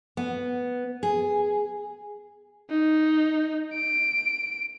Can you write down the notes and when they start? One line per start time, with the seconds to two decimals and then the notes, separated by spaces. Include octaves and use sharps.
0.17 B3
1.03 G#4
2.70 D#4
3.74 D7